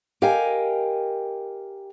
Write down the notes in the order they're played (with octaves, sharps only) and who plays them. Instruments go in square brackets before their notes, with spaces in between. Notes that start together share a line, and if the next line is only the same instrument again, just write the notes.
[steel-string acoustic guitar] G4 A#4 D#5 F5 G5 G#5